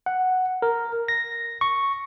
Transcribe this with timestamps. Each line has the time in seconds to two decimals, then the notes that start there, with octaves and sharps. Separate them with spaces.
0.06 F#5
0.62 A#4
1.08 A#6
1.61 C#6